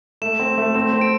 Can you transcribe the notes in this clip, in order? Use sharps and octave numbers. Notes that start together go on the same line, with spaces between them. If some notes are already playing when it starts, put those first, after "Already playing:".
A3 E7
C4
A3
C4 E7
C4
D7